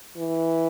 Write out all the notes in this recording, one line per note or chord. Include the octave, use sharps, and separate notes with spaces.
E3